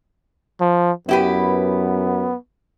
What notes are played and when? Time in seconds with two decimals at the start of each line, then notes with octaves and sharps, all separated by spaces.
0.61 F3
1.09 F#2 B3 E4 G4 B4